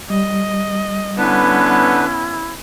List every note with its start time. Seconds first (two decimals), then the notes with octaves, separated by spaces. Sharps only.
0.10 G3 D#5
1.17 D3 B3 C#4 D4 E4 B4